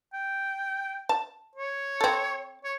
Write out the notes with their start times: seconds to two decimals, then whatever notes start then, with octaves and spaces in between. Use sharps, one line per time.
0.13 G5
1.09 A5
1.55 C#5
2.01 C4 A4
2.64 C#5